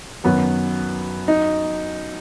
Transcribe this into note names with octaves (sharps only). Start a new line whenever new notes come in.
F#2 D#3 F#3 B3
D#4